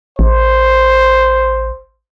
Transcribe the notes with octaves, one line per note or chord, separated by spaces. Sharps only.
A1 C5